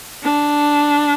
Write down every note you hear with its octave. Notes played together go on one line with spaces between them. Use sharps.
D4